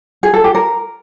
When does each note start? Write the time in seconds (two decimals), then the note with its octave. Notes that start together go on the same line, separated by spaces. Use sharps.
0.23 G#4
0.34 A4
0.44 G4
0.55 A#4